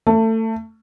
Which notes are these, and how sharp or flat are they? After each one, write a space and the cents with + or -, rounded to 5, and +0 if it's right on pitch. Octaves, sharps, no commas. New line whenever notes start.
A3 +25